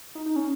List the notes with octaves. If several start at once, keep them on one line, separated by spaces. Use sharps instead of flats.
D#4
D#4
C#4